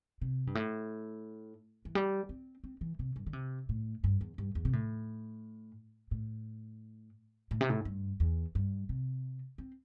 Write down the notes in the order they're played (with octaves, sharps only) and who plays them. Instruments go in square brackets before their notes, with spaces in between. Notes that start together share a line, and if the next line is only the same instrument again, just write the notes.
[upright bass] C3
G2
A2
E3
G3
C4
C4
E3
C3
G2
D3
C3
A2
G2
E2
G2
E2
C3
A2
A2
A2
C3
A2
G2
E2
G2
C3
C4